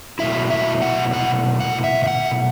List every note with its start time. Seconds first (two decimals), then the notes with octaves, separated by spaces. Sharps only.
0.19 B2 F#3 A3 E4 E5
0.50 E5
0.82 F#5
1.13 F#5
1.60 F#5
1.84 E5
2.04 E5
2.07 F#5